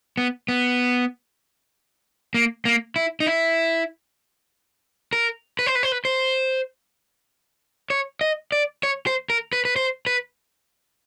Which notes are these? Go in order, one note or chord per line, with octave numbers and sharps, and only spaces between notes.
B3
B3
A#3
A#3
E4
D#4
E4
A#4
B4
C5
B4
C5
B4
C5
C#5
D#5
D5
C#5
C5
A#4
B4
B4
C5
B4